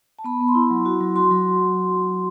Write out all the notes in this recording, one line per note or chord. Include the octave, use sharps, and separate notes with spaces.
A5
B3 B5
B3
C6
E4
F#3
F#4
F#3
F#4 C6
F#3